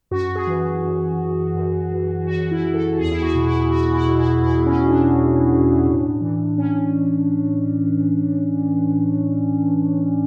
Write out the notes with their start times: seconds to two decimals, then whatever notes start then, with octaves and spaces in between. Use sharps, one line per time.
0.11 F#2 F#4
0.36 G#4
0.47 E3
0.84 F#2
1.19 E3
1.55 F#2
1.91 E3
2.26 F#2 F#4
2.51 E4
2.63 E3
2.74 A4
2.98 E2 G#4
3.11 E4
3.22 F#4
3.35 B2
3.46 E4
3.71 E2 F#4
3.94 E4
4.06 B2
4.18 E4
4.42 E2 E4
4.67 C#4
4.78 B2
4.90 D4
5.14 E2
5.50 B2
5.86 A2
6.21 E3
6.57 A2 C#4